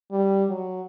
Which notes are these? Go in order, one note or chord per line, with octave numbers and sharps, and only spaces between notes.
G3
F#3